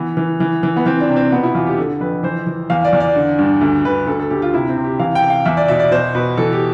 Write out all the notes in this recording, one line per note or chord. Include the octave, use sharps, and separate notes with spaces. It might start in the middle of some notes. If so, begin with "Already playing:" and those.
Already playing: E3 B3
E3
E3
E3
B3
E3 C4
D4
C3
C4
B2 B3
E4
E2 F4
G4
D3 A4
F2 B4
E3 C5
E3
E2 F5
D5
E2
D5
D3
G2
D2
D2 B4
D2 A4
A4
D2 G4
F4
C3 E4
C4
C3
G4
E3 F5
G5
C3
F5
E2 E5
D5
B2 E5
D5
B2 C5
B2 B4
E3 A4
G4